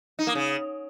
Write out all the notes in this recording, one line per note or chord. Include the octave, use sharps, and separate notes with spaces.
D#4
A#3
C#3